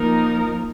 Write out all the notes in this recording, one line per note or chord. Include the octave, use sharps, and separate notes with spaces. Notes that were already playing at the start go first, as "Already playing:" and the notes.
Already playing: F3 A#3 D#4 A#4